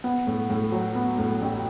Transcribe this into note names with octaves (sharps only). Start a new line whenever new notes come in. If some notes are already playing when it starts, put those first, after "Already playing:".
B3
A2
A2
F#3
B3
A2
A1